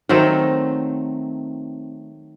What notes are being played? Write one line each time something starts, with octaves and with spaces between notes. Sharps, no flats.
D#3 F#3 A3 C4